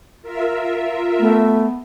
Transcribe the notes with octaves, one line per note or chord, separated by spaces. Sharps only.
F4 A#4 E5
A3 B3